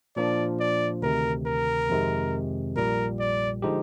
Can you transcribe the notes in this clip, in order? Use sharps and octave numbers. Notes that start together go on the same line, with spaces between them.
A#2 F3 A#3 D4 D5
D5
D2 C3 D#3 A#4
A#4
F2 C3 D#3 G#3
A#1 A#2 G3 A#4
D5
D3 F3 G#3 D#4 G4